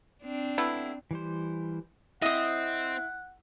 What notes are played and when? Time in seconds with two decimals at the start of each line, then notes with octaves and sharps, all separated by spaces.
0.23 C4 D4
0.58 A3 B3 E4
1.11 E3 G3 C5
2.22 C4 E4 D#5 F#5 D#6